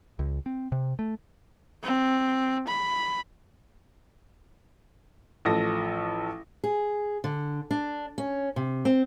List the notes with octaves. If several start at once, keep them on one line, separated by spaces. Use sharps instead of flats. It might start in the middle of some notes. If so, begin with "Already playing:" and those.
C#2
C4
C3
A3
C4
B5
A1 F3 A4 A#6
G#4
D3
D4
C#4
C3
C4